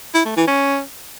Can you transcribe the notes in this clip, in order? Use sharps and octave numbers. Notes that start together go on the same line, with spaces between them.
E4
A3
E3
C#4